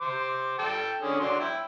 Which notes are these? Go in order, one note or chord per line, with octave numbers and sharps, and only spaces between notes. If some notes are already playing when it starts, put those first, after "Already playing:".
C5 D6
A4 G5 A5
D3 C#4 G#4
F#3 D4 C6
E4 G5